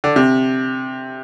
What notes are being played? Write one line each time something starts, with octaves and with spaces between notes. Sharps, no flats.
D3
C3